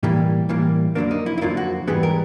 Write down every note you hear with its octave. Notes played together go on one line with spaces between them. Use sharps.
A2 E3 G3 A#3
A2 E3 G3 A#3
F2 D3 F#3 A#3 D4
D#4
E4
E4
F2 D3 F#3 A#3 F4
F#4
G#2 E3 G3 B3 G#4
A#4